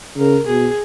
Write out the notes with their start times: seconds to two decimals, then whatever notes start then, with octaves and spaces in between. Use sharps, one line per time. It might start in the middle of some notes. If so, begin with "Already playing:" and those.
0.17 C#3 A#4
0.47 B2 G#4